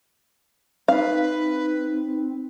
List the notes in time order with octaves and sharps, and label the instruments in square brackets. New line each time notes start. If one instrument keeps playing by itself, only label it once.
[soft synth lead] C4 [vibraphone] D#4 [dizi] B4 [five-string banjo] F5